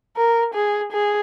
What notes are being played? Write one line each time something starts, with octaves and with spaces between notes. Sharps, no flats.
A#4
G#4
G#4